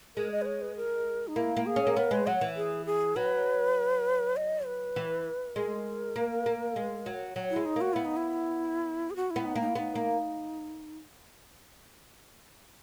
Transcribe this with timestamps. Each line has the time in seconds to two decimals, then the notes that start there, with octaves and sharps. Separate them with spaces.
0.16 G#3 A#4
0.31 D#5
0.42 B4
0.46 C#5
0.62 B4
0.76 A#4
1.28 D#4
1.36 A#3 E4
1.57 A#3
1.66 G#4
1.76 C#4
1.87 A#3
1.96 B3 A#4
2.11 G#3 B4
2.27 F#3 F#5
2.41 E3
2.56 G#4
2.86 G#4
3.16 F#3 B4
4.36 D#5
4.66 B4
4.96 E3
5.56 G#3 A#4
6.16 A#3
6.46 A#3
6.76 G#3
7.06 F#3
7.36 F#3
7.51 E4
7.56 G#3
7.66 D#4
7.76 A#3 F#4
7.93 B3 E4
8.05 D#4
8.17 E4
9.10 G#4
9.16 F#4
9.30 E4
9.36 B3
9.45 D#4
9.56 A#3
9.61 D#4
9.69 E4
9.75 B3 D#4
9.95 A#3